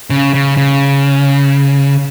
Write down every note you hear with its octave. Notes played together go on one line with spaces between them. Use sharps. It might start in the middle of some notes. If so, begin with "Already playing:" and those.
C#3
C#3
C#3